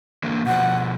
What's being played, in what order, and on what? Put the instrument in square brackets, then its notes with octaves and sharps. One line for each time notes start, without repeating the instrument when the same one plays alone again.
[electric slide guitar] D3 E3 A#3
[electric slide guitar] B2 F3 [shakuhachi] F#5